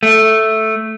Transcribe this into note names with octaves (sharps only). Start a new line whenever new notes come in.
A3